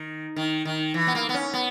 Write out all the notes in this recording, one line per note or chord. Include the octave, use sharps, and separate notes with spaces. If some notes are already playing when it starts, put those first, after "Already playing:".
Already playing: D#3
D#3
D#3
E3
B3
A#3
B3
C#4
B3